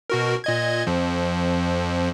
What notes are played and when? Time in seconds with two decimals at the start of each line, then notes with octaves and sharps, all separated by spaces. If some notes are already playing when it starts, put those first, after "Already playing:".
0.10 B2 F#4 A#4
0.44 A#2 D#5 G#6
0.87 F2 F3